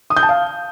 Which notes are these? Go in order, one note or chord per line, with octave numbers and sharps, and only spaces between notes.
D#6
G6
A5
F5